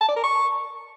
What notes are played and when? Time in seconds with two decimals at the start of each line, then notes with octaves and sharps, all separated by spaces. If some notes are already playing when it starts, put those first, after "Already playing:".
0.01 A5
0.09 D5
0.16 A#4
0.24 C#6